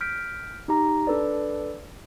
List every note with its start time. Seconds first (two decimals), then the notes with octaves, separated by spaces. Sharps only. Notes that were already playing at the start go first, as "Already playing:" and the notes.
0.01 F6 G6 B6 D7
0.68 D#4 G4 A#5
1.07 D4 A4 B4 D5